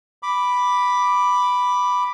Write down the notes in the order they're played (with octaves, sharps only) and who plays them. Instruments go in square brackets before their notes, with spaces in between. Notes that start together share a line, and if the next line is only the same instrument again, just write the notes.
[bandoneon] B5 D6